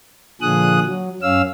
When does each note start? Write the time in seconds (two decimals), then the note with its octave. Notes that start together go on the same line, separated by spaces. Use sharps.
0.42 A#2 D3 F3 G#4 D#6 F#6
0.85 F#3
1.22 F#2 C#4 F5 E6